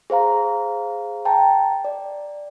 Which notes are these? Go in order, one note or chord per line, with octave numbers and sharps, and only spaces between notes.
G#4 C5 F5 A#5
G5 A5 A#5
D5